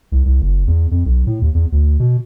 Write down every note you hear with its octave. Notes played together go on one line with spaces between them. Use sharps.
C2
C2
F#1
E2
F2
B1
A2
D#2
E2
D2
B2